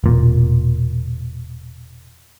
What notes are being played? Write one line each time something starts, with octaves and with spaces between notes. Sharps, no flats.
E1 A#2